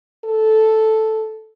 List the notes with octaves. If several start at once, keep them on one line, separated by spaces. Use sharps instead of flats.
A4